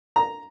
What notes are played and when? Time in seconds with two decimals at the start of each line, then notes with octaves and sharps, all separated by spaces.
0.16 A#5